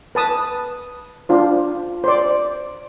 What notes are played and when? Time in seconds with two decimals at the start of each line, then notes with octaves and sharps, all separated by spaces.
0.15 B4 A5 D#6
1.29 D4 F4 C5
2.04 C5 D5